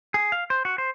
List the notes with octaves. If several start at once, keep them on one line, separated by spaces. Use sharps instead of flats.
G#4
F5
C5
F#4
C5